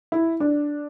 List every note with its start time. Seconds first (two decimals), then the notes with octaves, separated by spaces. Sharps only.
0.12 E4
0.40 D4